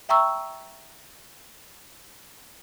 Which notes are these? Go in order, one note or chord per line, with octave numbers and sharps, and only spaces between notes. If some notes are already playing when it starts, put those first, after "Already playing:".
E5 G5 A#5 C#6 E6